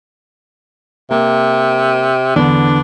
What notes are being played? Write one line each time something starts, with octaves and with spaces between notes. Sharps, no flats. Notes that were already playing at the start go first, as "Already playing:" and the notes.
C3 A#3
E2 D3 B3 D4